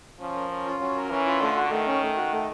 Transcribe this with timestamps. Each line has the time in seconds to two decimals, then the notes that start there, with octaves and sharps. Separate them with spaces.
0.20 F3 C#4
0.36 A#4
0.50 C#4
0.65 F4
0.80 F#3 C#4
0.96 A#4
1.10 E3 C#4
1.26 F4
1.41 D3 A3
1.57 F#4
1.71 D#3 A3
1.87 C#4
2.02 A3
2.17 F#4
2.32 A3